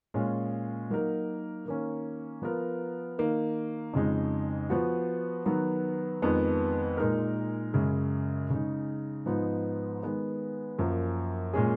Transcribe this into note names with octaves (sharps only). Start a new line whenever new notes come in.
A#2 G#3 C#4 F4
F#3 A#3 D#4 A#4
D#3 A#3 C#4
F3 B3 F4 A#4
D#3 A#3 D#4
F2 C#3 G#3 D#4
F3 B3 F#4
D#3 F#3 B3
F2 D#3 G#3 B3
A#2 G#3 D#4 A#4
F#2 C#3 G#3
C#3 G#3 D#4
G#2 F3 B3 D#4
D#3 G#3 B3
F#2 F3 A#3
A#2 G#3 C#4 G#4